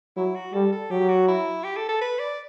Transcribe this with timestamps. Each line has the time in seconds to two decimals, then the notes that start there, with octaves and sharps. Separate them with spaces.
0.16 F#3 E4
0.35 F#4
0.53 G3 A4
0.72 A4
0.91 F#3 G4
1.09 F#4
1.28 E4
1.64 G4
1.76 A4
1.89 A4
2.01 B4
2.19 D5